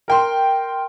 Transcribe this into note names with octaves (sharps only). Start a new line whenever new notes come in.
A#4 G5 C6